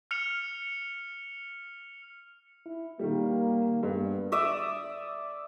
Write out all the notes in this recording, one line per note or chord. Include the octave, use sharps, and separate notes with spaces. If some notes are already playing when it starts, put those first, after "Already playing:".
F6 C#7 F7
E4
D#3 G3 A#3
G2 B3
D5 E5 D6 D#6